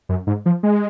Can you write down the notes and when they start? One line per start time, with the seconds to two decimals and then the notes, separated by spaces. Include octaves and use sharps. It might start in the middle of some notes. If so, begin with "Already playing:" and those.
0.09 F#2
0.27 G#2
0.46 F3
0.63 G#3